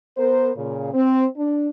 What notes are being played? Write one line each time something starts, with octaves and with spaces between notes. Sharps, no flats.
B3 A#4 C5
A#2 C#3
C4
D4